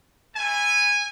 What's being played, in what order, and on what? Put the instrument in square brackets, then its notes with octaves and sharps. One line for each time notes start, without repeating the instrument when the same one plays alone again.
[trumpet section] A3 E4 G#5